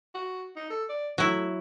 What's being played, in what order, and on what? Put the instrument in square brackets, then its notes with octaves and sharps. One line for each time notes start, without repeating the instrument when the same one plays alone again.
[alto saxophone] F#4
D#4
A4
D5
[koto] F#3 E4 [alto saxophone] A3